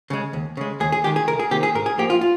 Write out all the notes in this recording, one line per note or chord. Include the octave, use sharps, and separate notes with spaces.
C#3 G#3
D#2
C#3 G#3
D#2 G#4
G#4
D#3 G#3 G4
G#4
C2 A#4
G#4
C3 D#3 A#3 G4
G#4
G#2 A#4
G#4
F3 A#3 G4
F4
F4